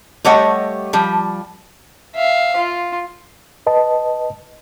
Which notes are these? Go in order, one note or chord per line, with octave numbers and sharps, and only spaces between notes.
G3 A3 G4 C#5 D#5 F#5
F3 G3
E5 F5
F4
B4 D#5 A5